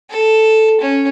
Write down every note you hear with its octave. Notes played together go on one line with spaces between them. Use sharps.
A4
C#4